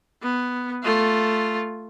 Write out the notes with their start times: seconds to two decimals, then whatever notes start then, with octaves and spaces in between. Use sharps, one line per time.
0.23 B3
0.83 A3 F4